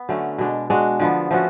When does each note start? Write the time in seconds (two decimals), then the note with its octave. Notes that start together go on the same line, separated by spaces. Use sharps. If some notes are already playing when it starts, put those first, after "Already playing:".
Already playing: B3
0.09 D3 F#3 A3 C#4
0.38 B2 G#3 D4
0.70 G#3 D4 F#4
1.00 D3 F3 B3
1.31 F3 A3 C#4 F#4